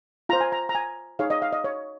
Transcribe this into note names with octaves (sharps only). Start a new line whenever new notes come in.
F4 C5 A#5
G#5
A#5
A#5
G#5
D#4 G#4 C#5 F5
D#5
F5
D#5
C#5